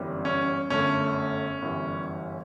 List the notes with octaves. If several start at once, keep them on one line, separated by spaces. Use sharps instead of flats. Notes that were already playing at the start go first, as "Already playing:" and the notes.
Already playing: G1 F#2 E3 G3
C#4
G1 F#2 D3 A3 C#4
G1 F#2 E3 G3